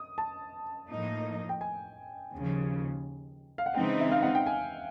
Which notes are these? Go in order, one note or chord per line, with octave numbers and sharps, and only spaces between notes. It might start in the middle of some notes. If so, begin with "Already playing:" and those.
Already playing: D#6
A5
A2 F3 A#3 D#4
G5
G#5
D#2 C#3 F3
F5
F#5
C#3 E3 G#3 C4 D#4 G5
E5
F5
F#5
G5
G#5